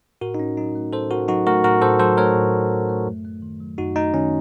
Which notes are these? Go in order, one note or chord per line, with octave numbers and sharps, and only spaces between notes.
A2 F#4 A#4
D#4
A2 C#4
F#3 D#4
A3
A2 A4 C5
A2 F#4 A#4
F#3 D#4 F#4
A3 F#4 A#4
A2 F#4 A#4
A2 A4 C5
F#3 A4 C5
A3 A#4 C#5
A2
A2
F#3
A3
F#2
A3
D#3
F#3
F#2 D#4 F#4
A3 D#4
D#3 C#4